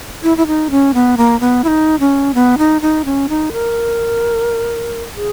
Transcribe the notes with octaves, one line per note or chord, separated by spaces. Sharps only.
E4
E4
D#4
C#4
B3
A#3
B3
E4
D#4
C#4
B3
D#4
D#4
C#4
D#4
A#4
G#4